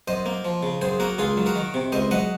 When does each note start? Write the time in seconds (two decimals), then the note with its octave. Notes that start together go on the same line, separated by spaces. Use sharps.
0.08 F#2 C5 D#5
0.26 A#3
0.45 F3
0.63 C#3
0.81 F#2 G#4 C5
1.00 A#3 F#4 A#4
1.18 C#2 F4 G#4
1.37 F#3
1.46 F#4 A#4
1.55 D#3
1.74 C3
1.92 C#2 C5 D#5
2.11 F#3 D#5 F#5